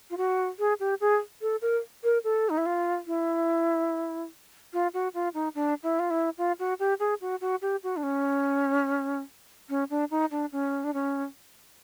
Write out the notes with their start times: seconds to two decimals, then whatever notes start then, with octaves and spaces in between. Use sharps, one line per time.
0.10 F4
0.17 F#4
0.59 G#4
0.80 G4
1.01 G#4
1.42 A4
1.62 A#4
2.04 A#4
2.24 A4
2.50 D#4
2.58 E4
2.66 F4
3.07 E4
4.73 F4
4.94 F#4
5.14 F4
5.34 D#4
5.55 D4
5.83 E4
5.99 F4
6.10 E4
6.38 F4
6.59 F#4
6.79 G4
7.00 G#4
7.21 F#4
7.41 F#4
7.62 G4
7.83 F#4
7.97 D4
8.03 C#4
9.70 C#4
9.90 D4
10.11 D#4
10.31 D4
10.52 C#4
10.84 D4
10.94 C#4